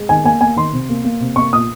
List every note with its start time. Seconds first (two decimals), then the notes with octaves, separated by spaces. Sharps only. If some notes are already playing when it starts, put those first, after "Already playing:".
Already playing: G#3
0.09 D#3 G#5
0.24 A#3 G#5
0.41 A#3 G#5
0.56 D#3 C6
0.72 C3
0.89 A#3
1.05 A#3
1.20 C3
1.36 A#3 C#6
1.53 A#2 D#6